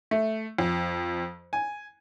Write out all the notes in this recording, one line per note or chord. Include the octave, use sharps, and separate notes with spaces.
A3
F2
G#5